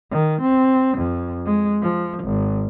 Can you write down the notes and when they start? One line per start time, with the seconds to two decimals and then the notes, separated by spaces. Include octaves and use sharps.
0.11 D#3
0.41 C4
0.98 F2
1.46 G#3
1.82 F3
2.24 G#1